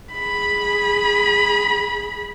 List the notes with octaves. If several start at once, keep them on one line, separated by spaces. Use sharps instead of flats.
G#4 B5